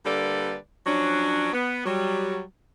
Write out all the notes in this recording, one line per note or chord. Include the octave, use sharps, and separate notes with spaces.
D3 G3 A#3 A4 B4 D5
F3 F#3 C#4 D4
B3
F#3 G3